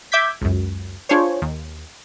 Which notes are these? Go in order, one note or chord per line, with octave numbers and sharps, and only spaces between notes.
E5 D6 G6 G#6 B6
C#2 F#2
D4 F4 G#4 C5 C#5
D#2